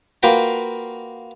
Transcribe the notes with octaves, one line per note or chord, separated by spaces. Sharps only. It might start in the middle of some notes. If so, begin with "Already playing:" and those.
A#3 F4 F#4 B4 G5 A#5